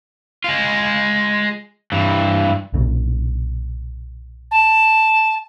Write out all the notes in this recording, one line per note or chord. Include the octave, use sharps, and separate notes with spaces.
G#3 F4
G2 E3
B1 A#2 C#3
A5